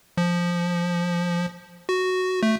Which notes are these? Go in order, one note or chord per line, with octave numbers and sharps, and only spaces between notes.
F3
F#4
A3